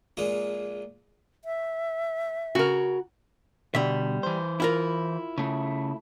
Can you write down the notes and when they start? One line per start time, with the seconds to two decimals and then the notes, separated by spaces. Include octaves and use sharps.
0.17 A#1 A#2 G#3 A#3 A#5 D#6
1.45 E5
2.55 C#3 F#4 A#4
3.75 B2 D3 G3 E5
4.23 E3 C5
4.60 E4 F4 A#4
5.38 C#3 A3